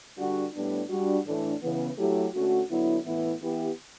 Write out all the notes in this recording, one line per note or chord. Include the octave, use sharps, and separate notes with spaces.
D3 G3 D4 F#4
A2 G3 B3 D4
G3 D4 F#4
A2 E3 A3 D4
C#3 E3 B3
F#3 A3 E4 G4
D3 A3 C#4 F#4
D3 F#3 B3 E4
A2 E3 B3 E4
E3 B3 E4 G4